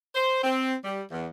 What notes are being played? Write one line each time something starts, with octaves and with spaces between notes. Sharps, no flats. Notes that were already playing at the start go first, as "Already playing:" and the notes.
C5
C4
G3
E2